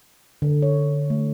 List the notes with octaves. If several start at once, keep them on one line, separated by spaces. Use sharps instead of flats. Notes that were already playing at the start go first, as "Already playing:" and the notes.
D3
C#5
A3